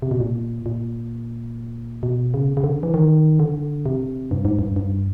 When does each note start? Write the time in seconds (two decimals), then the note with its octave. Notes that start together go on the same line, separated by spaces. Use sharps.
0.02 C3
0.11 B2
0.20 A#2
0.66 A#2
2.03 B2
2.34 C#3
2.57 C#3
2.64 D3
2.83 E3
2.94 D#3
3.40 D3
3.86 C3
4.31 G2
4.45 G#2
4.59 G2
4.76 G2